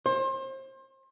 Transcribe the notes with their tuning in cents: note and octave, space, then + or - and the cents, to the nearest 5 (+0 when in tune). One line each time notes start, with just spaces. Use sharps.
C5 +35